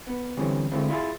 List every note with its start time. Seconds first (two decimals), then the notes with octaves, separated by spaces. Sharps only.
0.07 B3
0.37 D3 E3 G3 C4 C#4
0.72 D3 G#3 C4 D4 E4 F4
0.89 E4 F4 G#4 A6